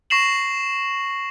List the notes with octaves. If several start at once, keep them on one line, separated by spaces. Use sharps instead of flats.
C#6 A#6 C7 E7 F#7